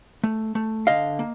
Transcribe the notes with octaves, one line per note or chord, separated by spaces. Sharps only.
A3
A3
D3 D#5 F5
A#3